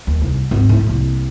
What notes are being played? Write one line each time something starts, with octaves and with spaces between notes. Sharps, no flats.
D#2
C2
G#1 D2
A2 A3
C2 A#3